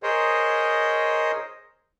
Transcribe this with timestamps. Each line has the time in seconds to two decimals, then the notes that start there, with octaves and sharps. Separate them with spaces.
0.03 G#4 A#4 C5 C#5 D#5